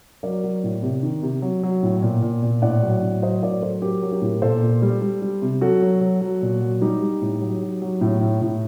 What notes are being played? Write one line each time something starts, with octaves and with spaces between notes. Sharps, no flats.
F#3 A#4 D5
F#3
A2
C3
D#3
C3
F#3
F#3
A2
A#2
A#2
A#2
A2 D5 F#5
F#3
A2
F#3 C5 D#5
A2 A#4 D5
F#3 A4 C5
F#3 G4 A#4
F#3
G4 A#4
A2
A#2 A4 C5
A#2
G3
G3
G3
C3
F#3 F#4 A4
F#3
F#3
F#3
A#2
F#3
G3 D#4 G4
G3
A2
F#3
F#3
F#3
A2
A2
A2